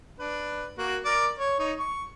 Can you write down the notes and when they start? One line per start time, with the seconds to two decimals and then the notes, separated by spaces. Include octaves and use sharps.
0.19 D4 B4
0.78 A#3 F#4
1.05 A#4 D5
1.38 C#5
1.59 D#4 C#5
1.79 C#6